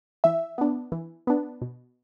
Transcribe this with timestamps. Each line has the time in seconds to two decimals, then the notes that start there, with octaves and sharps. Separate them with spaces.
0.24 E3 E5
0.58 B3 D4
0.92 E3
1.27 B3 D4
1.62 B2